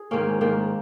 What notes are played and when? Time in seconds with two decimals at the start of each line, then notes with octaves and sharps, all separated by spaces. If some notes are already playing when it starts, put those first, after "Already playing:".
Already playing: G#4
0.11 G#2 D#3 A#3 C#4
0.41 G#2 D#3 A#3